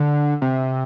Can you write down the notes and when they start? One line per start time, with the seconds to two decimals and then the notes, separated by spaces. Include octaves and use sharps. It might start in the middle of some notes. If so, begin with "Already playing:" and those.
Already playing: D3
0.42 C3